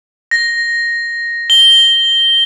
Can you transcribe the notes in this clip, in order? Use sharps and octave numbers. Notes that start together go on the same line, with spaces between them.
A#6
G7